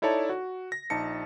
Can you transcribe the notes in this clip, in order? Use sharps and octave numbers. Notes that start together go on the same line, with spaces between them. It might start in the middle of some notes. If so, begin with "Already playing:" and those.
D#4 E4 A4 C#5 D5 A5
F#4
A#6
A#1 D#4 A5 C#7